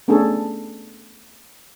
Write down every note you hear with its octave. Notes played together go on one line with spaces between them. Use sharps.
A3 B3 C#4 D4 G#4 A4